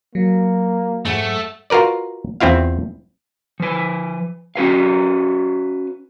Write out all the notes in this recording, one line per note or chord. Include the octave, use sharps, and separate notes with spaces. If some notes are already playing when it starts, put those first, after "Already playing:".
F#3 A#3
G#2 A3 A4 F#5
F4 F#4 A#4 B4 D5
E2 C4 E4 F4 F5
F3 B4
C#4 F#4 B4 F5